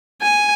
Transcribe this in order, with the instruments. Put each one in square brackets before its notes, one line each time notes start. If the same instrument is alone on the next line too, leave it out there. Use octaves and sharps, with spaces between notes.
[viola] G#5